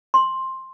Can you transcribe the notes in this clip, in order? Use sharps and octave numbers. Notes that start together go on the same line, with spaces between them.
C6